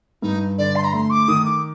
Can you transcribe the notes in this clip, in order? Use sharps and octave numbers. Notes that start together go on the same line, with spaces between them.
G2 D#4
D3 D5
C6
A#5
A3 C6
D6
D#3 D#6
D6